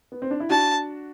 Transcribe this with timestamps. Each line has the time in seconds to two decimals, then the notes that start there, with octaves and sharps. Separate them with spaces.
0.12 B3
0.22 C4
0.31 D4
0.40 E4
0.49 D4 F#4 A5